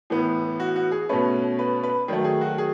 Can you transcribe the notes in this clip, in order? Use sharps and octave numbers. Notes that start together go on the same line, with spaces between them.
A2 E3 B3
F#4
F#4
G#4
B2 A3 C#4 B4
B4
B4
D#3 F#3 A3
G#4
F#4
G#4